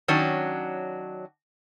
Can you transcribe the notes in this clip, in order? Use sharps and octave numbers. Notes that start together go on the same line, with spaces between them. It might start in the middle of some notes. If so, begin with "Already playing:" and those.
D#3 F#3 C#4 D4